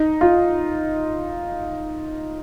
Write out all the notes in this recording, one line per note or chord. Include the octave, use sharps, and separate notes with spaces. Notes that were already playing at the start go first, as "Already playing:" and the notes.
Already playing: D#4
F4